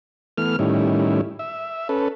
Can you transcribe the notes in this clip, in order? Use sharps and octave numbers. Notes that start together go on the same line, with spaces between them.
E3 A3 B3 F6
A2 D#3 G3 C#4 E4
E5
C#4 A4 B4